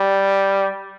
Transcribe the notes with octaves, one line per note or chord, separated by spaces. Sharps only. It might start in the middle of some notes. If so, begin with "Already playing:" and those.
Already playing: G3